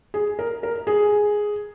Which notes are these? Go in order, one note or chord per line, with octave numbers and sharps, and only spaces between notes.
G#4
A#4
A#4
G#4